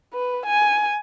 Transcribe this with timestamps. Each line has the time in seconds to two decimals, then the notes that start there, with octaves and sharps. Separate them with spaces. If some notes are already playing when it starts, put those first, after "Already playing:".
0.13 B4
0.46 G#5